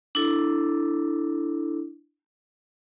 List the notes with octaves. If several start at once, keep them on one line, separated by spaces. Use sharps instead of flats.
D4 E4 A4